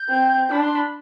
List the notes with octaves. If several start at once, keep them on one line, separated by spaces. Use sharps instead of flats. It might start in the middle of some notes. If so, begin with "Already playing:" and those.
Already playing: G6
C4
D4 B5
C6
B5